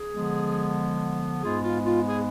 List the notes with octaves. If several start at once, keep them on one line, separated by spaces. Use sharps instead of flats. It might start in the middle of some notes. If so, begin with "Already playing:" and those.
Already playing: G#4
D3 F3 G#3 B3
G#2 G#3 B3 F4 G#4
F4
F4
G#4